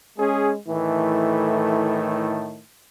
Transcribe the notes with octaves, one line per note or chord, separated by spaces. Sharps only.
G#3 C#4 G#4
A2 D#3 E3 A3